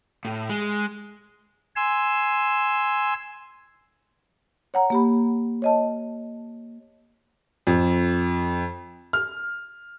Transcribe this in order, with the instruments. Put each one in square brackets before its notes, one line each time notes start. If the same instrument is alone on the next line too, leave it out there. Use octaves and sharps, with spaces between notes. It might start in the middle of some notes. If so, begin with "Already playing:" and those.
[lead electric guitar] A2
G#3
[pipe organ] G#5 C6 E6
[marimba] C#5 F#5 A#5
A#3 G4 B5
C#5 D#5 A5
[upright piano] F2
F6